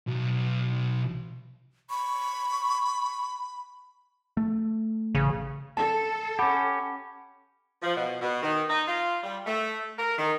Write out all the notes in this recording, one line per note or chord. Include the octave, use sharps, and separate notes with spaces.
B1
B5 C#6
A3
A1 C#3
A4 A5
C#4 G4 F#5 B5 D6
F3
B2
B2
D#3
D#4
F4
G3
A3
A#4
D#3